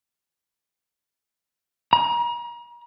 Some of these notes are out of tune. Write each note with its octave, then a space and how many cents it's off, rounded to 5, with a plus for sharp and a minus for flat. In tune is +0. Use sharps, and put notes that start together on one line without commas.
A#5 +35